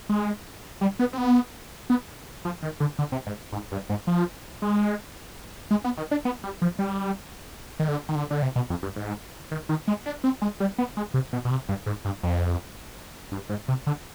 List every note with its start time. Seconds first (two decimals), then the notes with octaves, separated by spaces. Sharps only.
0.09 G#3
0.81 G3
0.99 B3
1.13 C4
1.18 B3
1.90 B3
2.45 F3
2.63 D#3
2.80 D3
2.99 D3
3.12 C3
3.26 G#2
3.52 G#2
3.72 G2
3.90 G#2
4.07 F3
4.62 G#3
5.71 G#3
5.84 B3
5.97 D#3
6.11 D4
6.25 B3
6.43 G3
6.62 F3
6.79 G3
7.80 D#3
7.88 D3
8.09 D#3
8.15 D3
8.31 D3
8.42 C3
8.56 B2
8.70 F2
8.83 G2
8.96 G#2
9.51 D#3
9.69 D#3
9.88 G#3
10.06 D4
10.24 C4
10.42 G#3
10.60 G3
10.78 B3
10.97 G#3
11.14 C3
11.33 B2
11.45 B2
11.51 C3
11.69 G2
11.86 G#2
12.05 G2
12.23 F2
13.32 G2
13.49 G#2
13.68 C3
13.87 D3